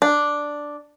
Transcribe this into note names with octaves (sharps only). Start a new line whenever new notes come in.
D4